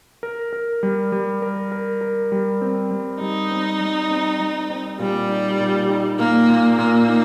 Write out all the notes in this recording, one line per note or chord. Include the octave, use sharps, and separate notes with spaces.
A#4
A#4
G3
G3
A#4
A#4
A#4
G3
C4
G3
G3 D#4
C4
G3
C4
G3
C4
A#2 G3
D#4
A#2
D#4
A#2 A#3
A#2
A#2 A#3
D#4